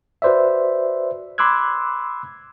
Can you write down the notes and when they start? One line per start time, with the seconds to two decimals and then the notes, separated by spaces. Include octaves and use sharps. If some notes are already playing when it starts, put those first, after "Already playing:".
0.22 F#4 B4 C5 D5 E5
1.38 B5 C6 D6 E6 F#6 G#6